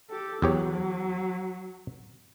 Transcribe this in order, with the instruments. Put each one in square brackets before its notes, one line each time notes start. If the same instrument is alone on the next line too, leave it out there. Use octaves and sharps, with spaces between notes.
[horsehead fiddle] G4 A4
[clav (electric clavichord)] E2 G4 C#5 [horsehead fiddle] F#3